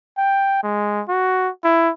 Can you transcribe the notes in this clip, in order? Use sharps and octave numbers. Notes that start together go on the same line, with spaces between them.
G5
G#3
F#4
E4